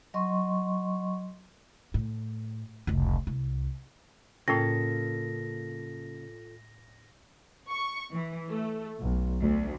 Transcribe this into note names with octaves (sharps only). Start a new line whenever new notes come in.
F#3 D#5 C6 C#6
A2
F1 C#2
C2
A2 C#3 A#3 F4 A4 G5 A#6
C#6
E3
A3
B1
D2